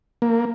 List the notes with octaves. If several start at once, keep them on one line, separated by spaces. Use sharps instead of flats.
A#3